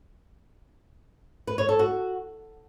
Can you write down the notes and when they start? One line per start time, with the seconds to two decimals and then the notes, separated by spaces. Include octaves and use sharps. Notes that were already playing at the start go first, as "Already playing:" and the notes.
1.47 B4
1.58 C#5
1.69 A4
1.79 F#4